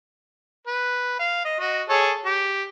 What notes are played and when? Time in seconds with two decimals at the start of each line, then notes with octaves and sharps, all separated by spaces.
0.67 B4
1.19 F5
1.45 D#5
1.60 F#4 D#5
1.89 G#4 A4 C#5
2.25 G4